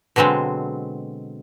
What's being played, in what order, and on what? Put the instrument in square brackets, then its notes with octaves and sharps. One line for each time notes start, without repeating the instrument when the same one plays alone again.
[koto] B2 D3 F#3 G#3 C4